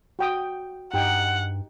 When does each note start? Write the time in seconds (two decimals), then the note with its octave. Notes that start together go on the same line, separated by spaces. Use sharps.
0.19 F#4 G5 D#6
0.93 G2 D#4 G4 F#5 G5